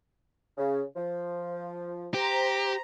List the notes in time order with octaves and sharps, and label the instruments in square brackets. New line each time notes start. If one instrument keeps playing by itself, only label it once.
[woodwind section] C#3
F3
[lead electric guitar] G4 [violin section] C5 A#5